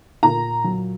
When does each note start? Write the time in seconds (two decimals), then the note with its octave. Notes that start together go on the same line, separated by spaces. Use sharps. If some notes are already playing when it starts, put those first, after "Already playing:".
0.23 A#2 A#5
0.64 F#3